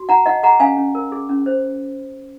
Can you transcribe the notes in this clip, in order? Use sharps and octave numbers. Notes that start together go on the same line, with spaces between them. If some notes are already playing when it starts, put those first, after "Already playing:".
Already playing: F#4
D#4 F#5 A#5
D#4 D#5 F#5
G#4 F#5 A#5
C#4 F5 G#5
C#4
A#4
G#4
C#4
C5